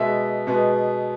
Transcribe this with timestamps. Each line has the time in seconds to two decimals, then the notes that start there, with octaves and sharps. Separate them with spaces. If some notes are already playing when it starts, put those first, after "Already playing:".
Already playing: B2 G#3 B3 E5
0.47 B2 G#3 B3